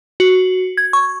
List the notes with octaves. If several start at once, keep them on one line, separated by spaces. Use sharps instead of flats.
F#4
G#6
C#6